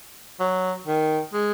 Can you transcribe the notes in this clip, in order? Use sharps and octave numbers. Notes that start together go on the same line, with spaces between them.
F#3
D#3
G#3